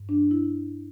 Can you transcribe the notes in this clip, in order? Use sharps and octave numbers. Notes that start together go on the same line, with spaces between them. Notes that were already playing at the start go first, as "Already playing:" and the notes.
Already playing: G2
D4
E4